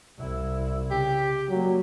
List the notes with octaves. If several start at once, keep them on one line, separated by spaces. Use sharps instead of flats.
C2 E4
C#3 G4
F#3 G3 A#3